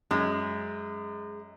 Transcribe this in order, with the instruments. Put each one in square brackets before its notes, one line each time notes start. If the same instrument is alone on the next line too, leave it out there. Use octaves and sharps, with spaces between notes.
[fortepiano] F#2 [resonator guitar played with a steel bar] G#3